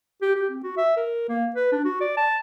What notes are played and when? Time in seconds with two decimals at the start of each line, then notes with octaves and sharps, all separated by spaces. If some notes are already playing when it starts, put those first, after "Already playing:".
0.22 G4
0.36 G4
0.50 C4
0.63 F#4
0.77 E5
0.97 A#4
1.28 A#3
1.56 B4
1.72 D4
1.85 F#4
2.00 D5
2.17 A5